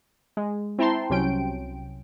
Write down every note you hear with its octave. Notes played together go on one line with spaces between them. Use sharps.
G#3
C4 E4 G5 A5 A#5 C6
C2 C3 F#3 C#4 G5 D7